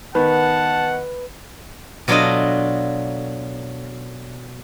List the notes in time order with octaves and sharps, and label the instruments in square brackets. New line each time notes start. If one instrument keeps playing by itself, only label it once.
[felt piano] D#3 B3 [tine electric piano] B4 [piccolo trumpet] F#5 [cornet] A5
[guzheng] B2 F#3 D4 F4 A4 D#5